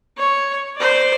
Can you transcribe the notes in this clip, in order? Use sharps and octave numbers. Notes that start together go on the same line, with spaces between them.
C#5
C5 D5